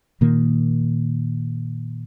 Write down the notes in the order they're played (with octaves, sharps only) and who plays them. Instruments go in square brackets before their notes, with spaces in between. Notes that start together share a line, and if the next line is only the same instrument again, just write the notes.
[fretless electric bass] A#2 D#3 A#3